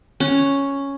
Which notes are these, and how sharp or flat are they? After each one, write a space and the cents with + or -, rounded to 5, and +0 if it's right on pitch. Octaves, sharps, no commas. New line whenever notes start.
C#4 +0